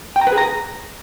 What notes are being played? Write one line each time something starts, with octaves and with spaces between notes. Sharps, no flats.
G5
A#5
B4
G#4
A#5